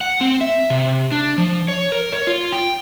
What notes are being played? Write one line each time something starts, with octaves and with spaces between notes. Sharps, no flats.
F#5
C4
E5
C3
D4
F3
C#5
A#4
C#5
F4
G5